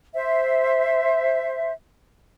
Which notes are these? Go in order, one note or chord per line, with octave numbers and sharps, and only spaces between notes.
C5 E5